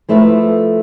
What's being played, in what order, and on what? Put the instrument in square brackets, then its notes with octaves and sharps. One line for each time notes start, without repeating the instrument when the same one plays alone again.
[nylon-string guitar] F3 A3 E4 A4 B4